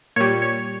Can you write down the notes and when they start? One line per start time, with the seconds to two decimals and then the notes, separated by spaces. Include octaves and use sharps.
0.16 A#2 G3 C#5
0.42 C#5